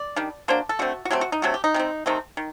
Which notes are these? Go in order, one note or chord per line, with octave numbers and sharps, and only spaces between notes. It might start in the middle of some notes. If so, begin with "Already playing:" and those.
Already playing: D5
D#3 G3 D4
F#3 A#3 D4 C5
A4
D3 A3 C4 F#4
F#4
F#3 A3 C4 G4
F#4
D#4
C3 F#3 A3 D4 F#4
G4
D#4
C3 G3 C4
C3 D#3 A3 C4
D#3